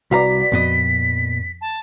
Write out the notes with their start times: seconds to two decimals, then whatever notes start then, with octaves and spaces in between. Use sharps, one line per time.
0.11 C2 F#4 B4 D5 F5 A#5 B6
0.52 F2 A#2 B3 D#5
1.61 A5